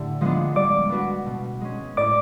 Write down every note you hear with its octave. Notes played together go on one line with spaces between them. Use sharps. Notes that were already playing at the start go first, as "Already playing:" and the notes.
Already playing: A2 D3 A3 G4
F3 G#3 B3 D4
G3 D5 D6
B3 D4 F#4 B4
B2
G#3 C#4
A2 D5 D6